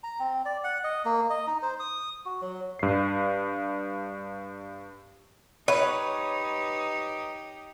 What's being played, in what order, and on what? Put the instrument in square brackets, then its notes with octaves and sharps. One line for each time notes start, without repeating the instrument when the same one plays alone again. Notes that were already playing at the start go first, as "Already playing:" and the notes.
[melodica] A#5
C4
D5
F#5
D#5
A#3
D#5
D#4
C5
D#6
F#4
F#3
[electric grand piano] G2 C7
[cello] D#4 G4 [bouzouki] B4 [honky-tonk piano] C#5